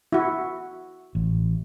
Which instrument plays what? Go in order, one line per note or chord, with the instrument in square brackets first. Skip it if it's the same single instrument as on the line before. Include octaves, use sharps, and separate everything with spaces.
[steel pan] E4 F#4
[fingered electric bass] A1